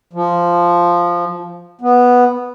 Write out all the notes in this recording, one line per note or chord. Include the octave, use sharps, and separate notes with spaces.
F3
B3